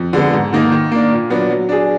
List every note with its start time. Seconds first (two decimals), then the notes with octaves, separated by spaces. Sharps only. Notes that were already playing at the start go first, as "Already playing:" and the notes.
Already playing: F2
0.13 D3 G#3 B3
0.33 G#2
0.53 D#3 A#3 D#4
0.72 D#3
0.92 A#3 D4
1.11 A#2
1.30 F#3 B3 D4
1.50 F#3
1.69 D4 G#4